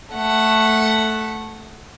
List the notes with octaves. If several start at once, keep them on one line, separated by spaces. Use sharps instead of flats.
A3 F#5